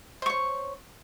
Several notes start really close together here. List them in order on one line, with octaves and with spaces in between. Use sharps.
C5 C#6 C#5